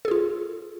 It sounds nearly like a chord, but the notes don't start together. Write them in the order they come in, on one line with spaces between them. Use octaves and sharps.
A4 G#4 F4